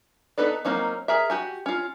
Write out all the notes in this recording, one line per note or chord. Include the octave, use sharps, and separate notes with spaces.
B3 D#4 A4 B4 D5
F#3 A#3 C4 C#4 D#4
G#4 A#4 E5
F#4 G4 G#5
C#4 F4